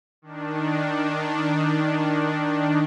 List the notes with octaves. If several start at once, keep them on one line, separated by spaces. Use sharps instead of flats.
D#3 D4